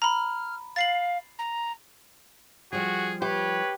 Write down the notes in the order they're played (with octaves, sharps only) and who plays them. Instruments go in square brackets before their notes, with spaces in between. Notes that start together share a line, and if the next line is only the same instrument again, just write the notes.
[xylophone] A#5 B5 [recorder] F6
[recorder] F5 [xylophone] A6 C7 F#7
[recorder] A#5
[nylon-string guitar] F3 G3 [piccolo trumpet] F#4 [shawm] G#4
[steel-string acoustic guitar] G4 [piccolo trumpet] B4 [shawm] C#5